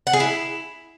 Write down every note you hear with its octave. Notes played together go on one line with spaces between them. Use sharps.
F#5
G#4
E4